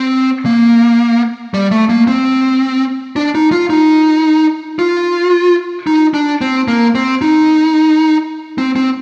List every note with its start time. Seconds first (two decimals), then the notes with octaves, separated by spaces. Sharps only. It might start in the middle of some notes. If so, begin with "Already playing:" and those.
Already playing: C4
0.45 A#3
1.54 G3
1.71 A3
1.89 A#3
2.07 C4
3.16 D4
3.35 D#4
3.52 F4
3.70 D#4
4.79 F4
5.87 D#4
6.14 D4
6.41 C4
6.68 A#3
6.95 C4
7.21 D#4
8.58 C4
8.76 C4